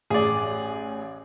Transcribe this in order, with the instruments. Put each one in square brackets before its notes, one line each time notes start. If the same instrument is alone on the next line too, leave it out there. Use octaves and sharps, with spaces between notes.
[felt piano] A1 [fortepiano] G#4 D5